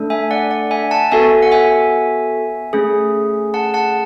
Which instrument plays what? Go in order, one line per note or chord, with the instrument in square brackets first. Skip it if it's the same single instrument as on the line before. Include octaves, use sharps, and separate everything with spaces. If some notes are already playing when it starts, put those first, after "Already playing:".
Already playing: [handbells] A3 D4 A4
E5 G#5
D5 F#5
D5 F#5
E5 G#5
F#5 A5
B3 F#4 A4 E5 G#5
F#5
E5 G#5
A3 C#4 G#4
F#5 A5
F#5 A5